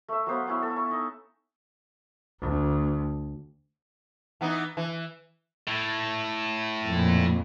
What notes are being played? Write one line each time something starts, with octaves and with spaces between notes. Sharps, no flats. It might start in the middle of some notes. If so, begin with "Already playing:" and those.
A3 E5
F#3 B3 C5 F5
B3 C#4 E4
A4
C#6
D#4
D2
E3 B3 D#4
E3
A2
F2 A#2